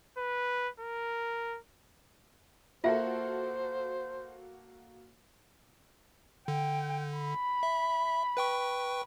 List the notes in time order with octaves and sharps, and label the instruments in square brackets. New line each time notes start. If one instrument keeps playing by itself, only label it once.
[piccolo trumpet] B4
A#4
[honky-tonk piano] A#3 F#4 A4 [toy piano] F4 E5 [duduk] C5
[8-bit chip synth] D3 [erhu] G5
[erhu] B5
[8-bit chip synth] E5
B4 G5 C#6